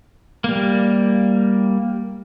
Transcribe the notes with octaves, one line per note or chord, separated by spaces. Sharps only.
G3 A#3